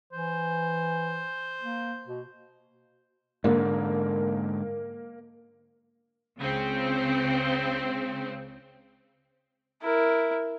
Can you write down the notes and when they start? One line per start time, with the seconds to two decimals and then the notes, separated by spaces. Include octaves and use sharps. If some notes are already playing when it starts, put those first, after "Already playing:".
0.13 E3 C5
1.61 A#3
2.07 B2
3.44 G#2 D3 A#3
6.40 C#2 C#3 C4
9.82 E4 A#4